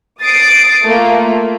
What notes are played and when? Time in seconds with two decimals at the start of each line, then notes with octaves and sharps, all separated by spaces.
0.20 D#6 A6 C7 D7
0.82 A3 A#3 F4